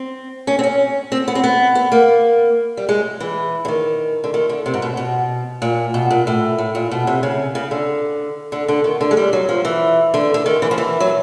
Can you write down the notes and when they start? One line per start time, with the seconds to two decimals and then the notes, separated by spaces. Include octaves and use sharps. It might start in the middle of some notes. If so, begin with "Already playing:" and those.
Already playing: C4
0.47 C#4
0.59 C4
0.64 C#4
1.12 C4
1.28 B3
1.35 C4
1.44 B3
1.75 B3
1.92 A#3
2.77 G3
2.89 G#3
3.20 E3
3.65 D3
3.68 D#3
4.24 D3
4.34 D#3
4.49 D3
4.66 C3
4.74 G#2
4.82 B2
4.97 B2
5.62 A#2
5.94 B2
6.11 A#2
6.27 A2
6.58 A2
6.75 A#2
6.91 B2
7.07 C3
7.23 C#3
7.55 C#3
7.71 D3
8.52 D3
8.68 D3
8.84 D#3
9.01 D3
9.11 G#3
9.17 G3
9.33 F#3
9.49 F3
9.65 E3
10.14 D3
10.34 D3
10.46 D#3
10.62 E3
10.71 F3
10.78 E3
11.00 F#3